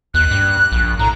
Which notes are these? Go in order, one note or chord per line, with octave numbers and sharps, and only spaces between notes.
D#2 F#6
G2
A#1
A2 A#5